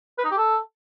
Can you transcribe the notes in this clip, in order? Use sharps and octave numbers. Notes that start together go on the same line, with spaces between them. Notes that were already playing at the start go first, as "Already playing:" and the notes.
B4
D#4
G4
A4